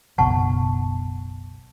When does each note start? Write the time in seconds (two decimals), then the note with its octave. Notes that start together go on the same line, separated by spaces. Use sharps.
0.18 F#1 B1 B2 F#5 A5 C#6